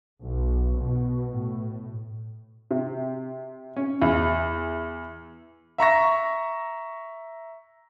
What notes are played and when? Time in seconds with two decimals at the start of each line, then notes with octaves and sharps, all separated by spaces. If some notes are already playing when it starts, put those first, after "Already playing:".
0.22 B1
0.81 B2
1.30 A2
2.71 C3
3.76 C#4
4.02 E2
5.78 E5 A#5 C#6 A#6